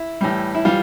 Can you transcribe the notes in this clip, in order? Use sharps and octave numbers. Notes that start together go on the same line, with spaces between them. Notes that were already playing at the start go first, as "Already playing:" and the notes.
Already playing: E4
A2 E3 G3
E4
E3 G3 F4